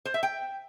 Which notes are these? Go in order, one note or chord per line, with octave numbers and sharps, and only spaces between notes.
C5
E5
G5